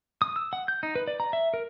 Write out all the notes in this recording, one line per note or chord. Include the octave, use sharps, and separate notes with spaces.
D#6
E6
F#5
G6
D#4
B4
D5
A#5
E5
A#4